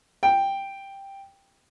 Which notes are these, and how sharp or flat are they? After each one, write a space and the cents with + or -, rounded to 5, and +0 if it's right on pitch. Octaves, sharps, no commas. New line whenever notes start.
G5 +5